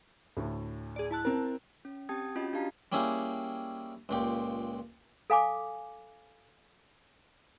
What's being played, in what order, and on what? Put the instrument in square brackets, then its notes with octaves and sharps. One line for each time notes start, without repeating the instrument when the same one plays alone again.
[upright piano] D2 A2
[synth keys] G#4 D5
E4 A5 F#6
[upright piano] C4 A#4
[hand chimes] C#4
C4 G4 G5 A5 D#6 G#6
C#4 F4 F#4 D#5
D4 F#4 G4 F5 A5 A#5
[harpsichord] G3 A#3 C#4 E4 G4 G#4
C#2 A#2 G4
[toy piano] A4 F5 G#5 D6